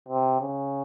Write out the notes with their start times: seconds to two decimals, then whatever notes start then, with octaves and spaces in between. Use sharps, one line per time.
0.09 C3
0.41 C#3